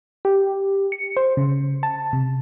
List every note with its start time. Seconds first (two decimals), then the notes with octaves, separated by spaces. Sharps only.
0.25 G4
0.92 C#7
1.17 C5
1.37 C#3
1.83 A5
2.13 C3